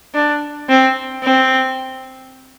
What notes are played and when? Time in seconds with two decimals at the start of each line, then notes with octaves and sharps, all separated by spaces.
0.15 D4
0.69 C4
1.24 C4